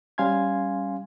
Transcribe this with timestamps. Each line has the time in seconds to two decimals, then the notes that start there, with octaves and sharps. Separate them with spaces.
0.18 G3 C#4 F5 G#5 C6 G#6